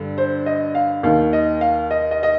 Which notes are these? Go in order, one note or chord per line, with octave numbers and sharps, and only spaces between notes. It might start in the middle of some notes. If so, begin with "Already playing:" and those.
Already playing: G2 D3
C5
D#5
F5
D#2 D#3 F5
D#5
F5
D#5
D#5
D#5